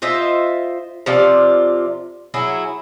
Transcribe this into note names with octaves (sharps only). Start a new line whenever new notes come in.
F4 C5 D#5 E5
C3 F3 F4 D5
F#3 E4 G#4